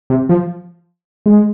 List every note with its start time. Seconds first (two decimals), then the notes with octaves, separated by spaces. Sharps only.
0.10 C3
0.29 F3
1.26 G#3